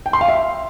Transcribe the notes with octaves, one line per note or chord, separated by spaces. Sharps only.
G5
C6
F5
E5